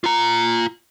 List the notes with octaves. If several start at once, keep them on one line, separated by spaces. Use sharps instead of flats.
F4 A#5